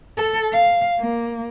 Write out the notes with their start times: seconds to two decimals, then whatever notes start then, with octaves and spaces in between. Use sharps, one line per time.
0.18 A4
0.52 F5
1.00 A#3